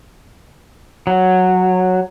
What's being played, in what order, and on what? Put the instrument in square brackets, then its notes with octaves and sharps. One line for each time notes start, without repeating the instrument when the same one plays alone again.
[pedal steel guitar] F#3